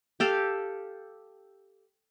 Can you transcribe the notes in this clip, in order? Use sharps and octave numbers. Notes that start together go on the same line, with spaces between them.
G4 A4 F5